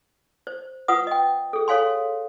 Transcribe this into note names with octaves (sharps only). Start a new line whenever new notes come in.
C5
F4 B4 F#5 D#6
D#5 G5
G#4 A4
A4 C#5 F5 G#5 C6